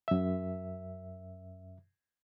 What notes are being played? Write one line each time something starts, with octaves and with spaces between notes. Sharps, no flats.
F#2 E5